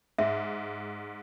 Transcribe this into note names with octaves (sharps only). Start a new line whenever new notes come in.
G#2 E5